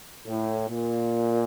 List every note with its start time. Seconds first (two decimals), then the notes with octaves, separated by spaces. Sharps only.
0.27 A2
0.69 A#2